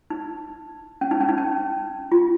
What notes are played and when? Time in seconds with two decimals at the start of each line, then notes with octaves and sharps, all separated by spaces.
0.10 D#4
1.01 C#4
1.11 D#4
1.20 C#4
1.29 D#4
1.38 C#4
2.12 F4